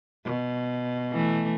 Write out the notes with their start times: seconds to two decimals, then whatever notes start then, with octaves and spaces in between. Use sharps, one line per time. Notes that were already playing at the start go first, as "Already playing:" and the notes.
0.25 B2
1.12 E3 A3